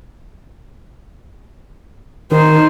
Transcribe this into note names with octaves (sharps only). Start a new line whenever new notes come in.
D#3 D#4 C5